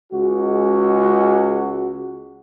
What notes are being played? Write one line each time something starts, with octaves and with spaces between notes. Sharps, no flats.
C#2 G#3 F#4